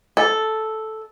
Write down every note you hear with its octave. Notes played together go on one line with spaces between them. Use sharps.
A4